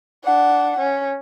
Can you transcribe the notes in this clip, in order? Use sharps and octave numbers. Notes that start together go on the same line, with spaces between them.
D4 F#5
C#4